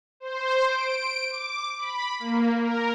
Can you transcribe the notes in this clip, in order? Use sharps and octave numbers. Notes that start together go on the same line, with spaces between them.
C5
D7
D6
B5
A#3
A#4